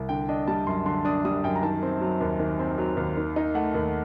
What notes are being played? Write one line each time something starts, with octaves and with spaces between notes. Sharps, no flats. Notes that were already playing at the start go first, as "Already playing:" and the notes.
Already playing: C2
D3 G5
D4 D#5
G3 A5
F#2 C6
D3 C6
D4 D#6
G3 D#6
F#2 G5
A#5
D#3 A5
C4
F#3
D#2
D#3
C4
F#3
D#2
D#3
D#4
A3 F#5
D#2